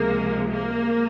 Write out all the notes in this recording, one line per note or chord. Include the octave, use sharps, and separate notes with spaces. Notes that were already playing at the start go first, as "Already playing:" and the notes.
Already playing: C#2 C3 F3 G#3 A#3
A#3